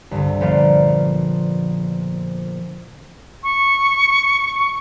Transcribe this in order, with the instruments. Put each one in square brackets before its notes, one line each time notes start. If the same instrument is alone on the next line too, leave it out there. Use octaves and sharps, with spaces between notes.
[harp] C2 G2 D3
A#1 F3 B3 C5 D5 F5
[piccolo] C#6